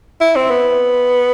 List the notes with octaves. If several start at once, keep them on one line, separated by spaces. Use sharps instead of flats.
E4
C4
B3